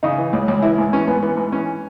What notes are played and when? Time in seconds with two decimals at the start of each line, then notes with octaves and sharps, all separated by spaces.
0.03 C#3 D#4
0.18 E3
0.33 C#2
0.48 C#2
0.62 E3 E4
0.78 G#2
0.93 E3 C#4
1.07 G#2 B3
1.23 E3 B3
1.37 G#2
1.52 E3 C#4